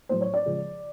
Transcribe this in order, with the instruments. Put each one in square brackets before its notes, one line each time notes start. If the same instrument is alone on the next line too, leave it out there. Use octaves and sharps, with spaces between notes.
[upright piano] A2 F#3 C5
C#5
D5
C#3 F3 G#3